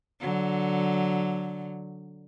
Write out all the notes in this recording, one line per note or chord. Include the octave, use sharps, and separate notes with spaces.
D3 F#3